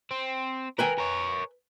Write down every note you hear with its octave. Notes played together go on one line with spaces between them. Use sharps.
C4
A#4 B4 G5 G#5
A#4 C#5